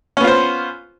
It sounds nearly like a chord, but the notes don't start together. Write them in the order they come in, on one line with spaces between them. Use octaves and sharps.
C#4 B3 F4 C5